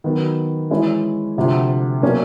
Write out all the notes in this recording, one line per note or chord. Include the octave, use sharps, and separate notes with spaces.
D#3 F#3 B3
E3 G#3 C#4 E4
D2 C3 F3
B2 F#3 A#3 C#4